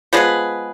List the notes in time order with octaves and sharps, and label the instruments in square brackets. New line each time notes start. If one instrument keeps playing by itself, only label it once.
[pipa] F3 G#3 B3 G#4 B4